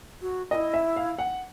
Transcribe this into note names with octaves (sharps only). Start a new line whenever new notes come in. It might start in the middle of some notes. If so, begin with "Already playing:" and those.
F#4
E4 F#4 D#5
E5
F5
F#5